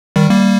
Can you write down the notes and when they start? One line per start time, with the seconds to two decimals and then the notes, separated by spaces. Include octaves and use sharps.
0.16 D#3 G3
0.30 G3 A#3